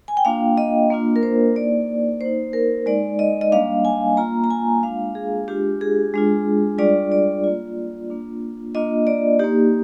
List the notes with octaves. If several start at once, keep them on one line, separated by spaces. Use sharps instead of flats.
G#5
G5
A#3 D4 F4 F5
D#5
A#3 D4 F4
A#4
C5
A#3 D#4 D5
A#3 D#4 C5
A#4
G#3 D#4 D5
D#5
D#5
G3 A#3 D4 F5
G#5
A#3 F4 A#5
A#5
G#5
G#3 D4 F4 F5
G#4
G#3 D4 F4 G4
G#4
G#3 D4 F4
G3 D4 F4 D5
D5
A#3 F4
A#3 D4 F4
A#3 D4 F4 D#5
D5
A#3 D#4 G4